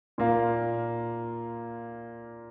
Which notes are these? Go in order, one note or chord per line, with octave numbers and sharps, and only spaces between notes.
A#2 A#3 F4